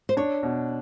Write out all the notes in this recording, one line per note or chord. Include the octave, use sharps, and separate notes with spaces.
C5
D4 C#5
B2